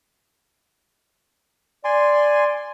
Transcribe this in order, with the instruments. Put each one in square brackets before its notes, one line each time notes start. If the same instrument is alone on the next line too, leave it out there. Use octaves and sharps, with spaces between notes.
[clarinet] D5 [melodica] G#5 C6